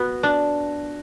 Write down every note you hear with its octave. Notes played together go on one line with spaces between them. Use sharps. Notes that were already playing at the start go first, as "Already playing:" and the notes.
Already playing: B3 F#4
D4